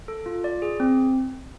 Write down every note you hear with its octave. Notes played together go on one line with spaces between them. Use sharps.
A4
F4
D5
G#4
C4